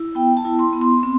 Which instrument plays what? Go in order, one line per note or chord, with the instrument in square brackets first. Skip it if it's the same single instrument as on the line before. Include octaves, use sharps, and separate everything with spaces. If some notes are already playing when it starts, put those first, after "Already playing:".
Already playing: [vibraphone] E4
B3 G5
A5
E4
C6
B3
C6
C4